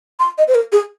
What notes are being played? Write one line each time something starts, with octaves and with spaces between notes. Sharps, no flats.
C6
D#5
C5
A#4
G#4